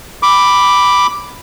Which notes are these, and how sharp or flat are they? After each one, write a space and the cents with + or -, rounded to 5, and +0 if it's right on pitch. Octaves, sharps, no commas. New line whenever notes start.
B5 +0 D6 +0